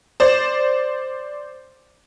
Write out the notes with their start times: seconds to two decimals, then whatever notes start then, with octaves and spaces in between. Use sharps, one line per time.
0.20 C5 D5